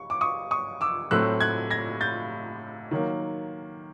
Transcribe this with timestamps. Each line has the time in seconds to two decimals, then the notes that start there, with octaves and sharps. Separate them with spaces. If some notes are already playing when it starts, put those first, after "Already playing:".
Already playing: C#6
0.10 D6
0.21 C#6 D#6
0.51 C#6 D#6
0.81 D6 E6
1.11 A2 F#3 A3 C4 E6 F#6
1.40 F#6 G#6
1.71 G#6 A#6
2.01 G6 A6
2.91 D#3 F#3 A#3